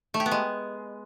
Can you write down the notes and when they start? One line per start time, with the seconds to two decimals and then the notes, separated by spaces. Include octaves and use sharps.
0.14 A3
0.20 G4
0.26 B3
0.31 G#3